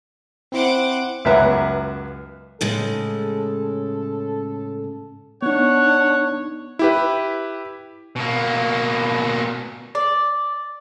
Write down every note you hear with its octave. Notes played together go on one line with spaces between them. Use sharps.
C4 E4 C5 F#5 D6
C#2 F#2 B3 B4 E5 A#5
A2 C#3 G#3 A4
B3 D4 D#4 C#5 F#5
E4 G4 B4
B2 A#3
D5